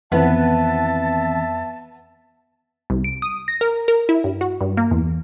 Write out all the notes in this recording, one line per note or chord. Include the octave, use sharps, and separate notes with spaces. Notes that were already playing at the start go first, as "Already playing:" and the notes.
F2 D#3 E3 B3 C4 E5 A5
C2
D7
D#6
A#6
A#4
A#4
E4
G2
F#4
G2
A#3
E2